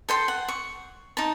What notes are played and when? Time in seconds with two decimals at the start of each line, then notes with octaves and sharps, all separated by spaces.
0.09 A4 G5 C6
0.28 F#5
0.48 C#6
1.17 D#4 A5